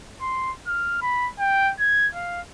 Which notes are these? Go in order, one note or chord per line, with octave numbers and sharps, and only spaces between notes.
C6
F6
B5
G5
G#6
F5